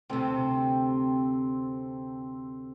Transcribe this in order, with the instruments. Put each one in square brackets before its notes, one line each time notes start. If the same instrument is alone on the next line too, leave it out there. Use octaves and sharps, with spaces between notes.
[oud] D2 C3 [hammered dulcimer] C4 A4 G5